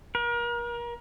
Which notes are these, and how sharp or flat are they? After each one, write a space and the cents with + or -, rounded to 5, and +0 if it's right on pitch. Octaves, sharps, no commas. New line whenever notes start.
A#4 +35